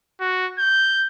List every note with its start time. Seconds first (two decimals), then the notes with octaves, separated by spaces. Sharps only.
0.20 F#4
0.59 G6